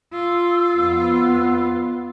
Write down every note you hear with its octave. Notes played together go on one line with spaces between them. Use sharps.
F4 E6
F2 B3